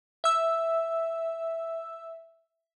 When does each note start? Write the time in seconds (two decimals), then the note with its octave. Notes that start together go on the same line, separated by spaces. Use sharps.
0.24 E5 E6